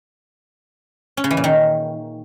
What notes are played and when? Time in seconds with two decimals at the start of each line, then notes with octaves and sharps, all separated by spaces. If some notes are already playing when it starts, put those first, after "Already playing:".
1.17 C#4
1.24 C#3
1.31 E3
1.37 A#2
1.44 D#3